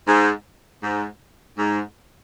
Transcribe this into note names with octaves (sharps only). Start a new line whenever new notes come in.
G#2
G#2
G#2